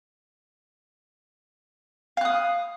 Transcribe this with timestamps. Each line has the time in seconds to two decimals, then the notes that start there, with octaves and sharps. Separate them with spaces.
2.17 F5
2.21 F#6
2.25 D#6